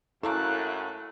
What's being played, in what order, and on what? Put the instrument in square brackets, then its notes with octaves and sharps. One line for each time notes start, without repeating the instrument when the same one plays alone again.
[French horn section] F#2 [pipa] E3 A3 A#3 [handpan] E4 A4 [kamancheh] F5 F#6